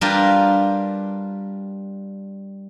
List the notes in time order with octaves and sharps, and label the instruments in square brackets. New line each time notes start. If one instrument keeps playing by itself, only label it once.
[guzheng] G3 D4 F4 G4 A#4 B4